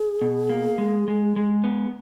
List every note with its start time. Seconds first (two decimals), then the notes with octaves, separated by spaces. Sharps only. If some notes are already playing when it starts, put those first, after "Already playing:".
Already playing: G#4
0.22 B2
0.49 A#3
0.78 G#3
1.08 G#3
1.36 G#3
1.64 B3